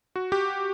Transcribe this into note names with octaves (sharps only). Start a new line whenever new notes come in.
F#4
G4